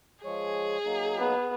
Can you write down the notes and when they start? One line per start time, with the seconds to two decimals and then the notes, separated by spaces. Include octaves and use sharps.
0.25 F3 G#3 G#4 C#5
0.85 F#3 A#3 D#4
1.18 B3